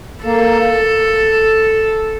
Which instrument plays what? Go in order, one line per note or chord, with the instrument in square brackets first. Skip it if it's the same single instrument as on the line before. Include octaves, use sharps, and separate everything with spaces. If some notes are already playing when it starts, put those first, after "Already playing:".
[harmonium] A#3 [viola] A4